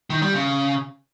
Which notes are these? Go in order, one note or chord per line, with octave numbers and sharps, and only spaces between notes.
D#3
G3
C#3